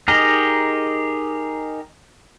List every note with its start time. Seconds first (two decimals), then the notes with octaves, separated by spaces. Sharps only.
0.08 D#4 G4 G#4 A#4 D#5